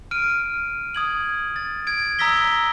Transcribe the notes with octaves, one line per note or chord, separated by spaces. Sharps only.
F6 D7 D#7
D#6 G#6 F#7
A6
G#6 D7
A#5 D#6 E6 A#6 B6 G7